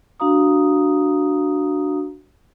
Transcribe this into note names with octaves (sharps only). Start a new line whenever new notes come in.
D4 F#4 F5 A#5 D#6